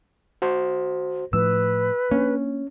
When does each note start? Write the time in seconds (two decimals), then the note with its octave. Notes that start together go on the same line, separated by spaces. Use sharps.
0.42 F#4 C5
1.33 A2 F3 B4 E6
2.11 A#3 C#4 D4